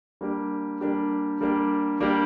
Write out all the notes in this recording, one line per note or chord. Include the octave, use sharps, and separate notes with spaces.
G3 A#3 D4 G4
G3 A#3 D4 G4
G3 A#3 D4 G4
G3 A#3 D4 G4